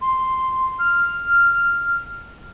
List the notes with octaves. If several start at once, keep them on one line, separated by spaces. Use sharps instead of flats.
C6
F6